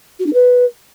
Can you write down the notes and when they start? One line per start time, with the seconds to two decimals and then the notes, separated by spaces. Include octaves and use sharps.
0.19 F#4
0.26 D4
0.33 B4